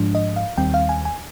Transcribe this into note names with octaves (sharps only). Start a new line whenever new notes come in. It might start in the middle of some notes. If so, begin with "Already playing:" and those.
Already playing: G#2 F3 G#3 D4
D#5
F5
D#2 D#3 G3 C4 G5
F5
G#5
G#5